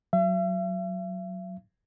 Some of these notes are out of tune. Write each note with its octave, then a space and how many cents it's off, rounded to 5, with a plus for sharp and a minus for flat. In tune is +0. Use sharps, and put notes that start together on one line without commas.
F#3 +0 E5 +45